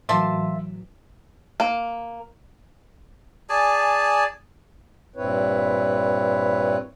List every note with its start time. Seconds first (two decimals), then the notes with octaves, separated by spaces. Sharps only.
0.09 A2 E3 F#3 A#3 E5 A5 C6
1.60 A#3
3.49 G#4 D5 G#5 A5
5.16 G2 A#2 C4 E4 B4 C#5